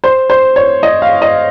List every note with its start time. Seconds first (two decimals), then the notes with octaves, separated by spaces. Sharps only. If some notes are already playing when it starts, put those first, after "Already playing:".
0.04 C5
0.30 C5
0.56 C#5
0.83 D#5
1.02 F5
1.22 D#5